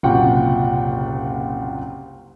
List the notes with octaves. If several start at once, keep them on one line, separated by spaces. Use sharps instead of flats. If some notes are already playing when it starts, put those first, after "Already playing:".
F#1 C2 A#2 F#4 F#5 G5